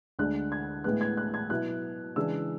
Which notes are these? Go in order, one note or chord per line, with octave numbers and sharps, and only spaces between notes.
D2 D3 G#3 D4 F#6
G#6
A2 G#3 B3 F#6
G#6
F#6
G#6
B2 F#3 B3 E4 F#6
C#3 E3 G#3 D4 E6